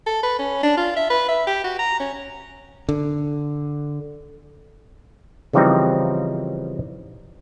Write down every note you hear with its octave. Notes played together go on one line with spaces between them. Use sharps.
A4
B4
C#4
D4
F4
E5
B4
E5
G4
F#4
A#5
C#4
D3
C#3 E3 F3 G3 C4 D#4